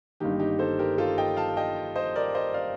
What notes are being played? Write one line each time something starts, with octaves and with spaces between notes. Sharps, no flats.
G1 G2 D#3 A#3 D#4 G4
D#4 G4
A4 C5
G4 A#4
F4 A4
D#5 G5
F5 A5
D#5 G5
C5 D#5
A#4 D5
C5 D#5
D5 F5